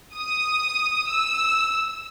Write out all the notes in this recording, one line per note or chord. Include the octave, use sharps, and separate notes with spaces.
D#6
E6